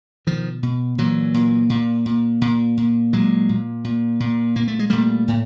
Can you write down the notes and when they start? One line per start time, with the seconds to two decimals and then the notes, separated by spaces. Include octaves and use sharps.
0.27 B2 D#3 F3
0.63 B2
0.98 A#2 E3 F#3
1.34 A#2
1.70 A#2
2.06 A#2
2.41 A#2
2.77 A#2
3.13 A#2 F#3 G#3
3.49 A#2
3.84 A#2
4.20 A#2
4.55 A#2 A#3
4.68 A3
4.79 G#3
4.90 A#2 G3 A3
5.28 A2